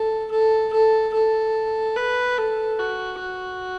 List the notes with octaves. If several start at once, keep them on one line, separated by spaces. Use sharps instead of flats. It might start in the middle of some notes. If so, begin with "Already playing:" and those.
Already playing: A4
A4
A4
A4
B4
A4
F#4
F#4